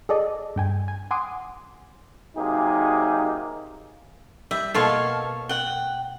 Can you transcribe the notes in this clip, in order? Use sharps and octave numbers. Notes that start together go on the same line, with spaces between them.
G#4 A4 D5 D#5
G2 G5 G#5
G#5
F#5 G#5 C6 D6 D#6
C3 F#3 A#3 D#4 G#4
G3 E5
B2 A#3 F4 A4 C#5 F5
F#5 G5